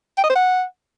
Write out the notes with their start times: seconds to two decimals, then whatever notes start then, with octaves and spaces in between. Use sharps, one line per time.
0.18 G5
0.23 D#5
0.29 C5
0.35 F#5